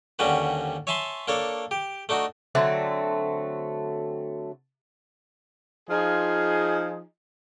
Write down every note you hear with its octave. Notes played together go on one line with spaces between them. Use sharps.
D#2 D3 G3 C#4 F#4 B4
C#5 E5 G#5 A5 B5 C6
A#3 D4 A4 C#5
G4
A3 D4 D#4 F#4
D3 F#3 A3 C4
F3 D#4 F4 G#4